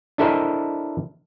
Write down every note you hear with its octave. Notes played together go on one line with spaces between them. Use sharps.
D4 E4 A4 A#4 C5 D#5